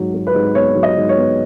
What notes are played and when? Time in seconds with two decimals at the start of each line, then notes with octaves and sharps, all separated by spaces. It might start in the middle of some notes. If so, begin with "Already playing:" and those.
Already playing: G#2 F#3
0.14 F#3
0.27 B4
0.34 G#2
0.55 B3 C#5
0.75 F#3
0.83 D#5
0.97 G#2
1.09 C#5
1.16 B3